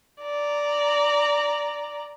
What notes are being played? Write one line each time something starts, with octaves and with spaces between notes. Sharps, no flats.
D5 A#5